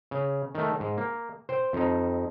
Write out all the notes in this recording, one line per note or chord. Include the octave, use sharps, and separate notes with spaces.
C#3
D#3 A3
G#2
A#3
C5 G5
F2 D#4